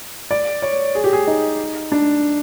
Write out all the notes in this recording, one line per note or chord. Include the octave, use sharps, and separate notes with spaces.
D5
C#5
G#4
G4
G#4
D#4
D4